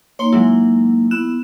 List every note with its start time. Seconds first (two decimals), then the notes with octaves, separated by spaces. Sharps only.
0.19 A#3 D#4 C#5 C6 G7
0.33 F#3 G#3 E4
1.11 B3 E4 F#6 E7